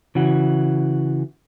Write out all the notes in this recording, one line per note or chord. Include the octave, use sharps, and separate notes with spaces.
C#3 E3 F#4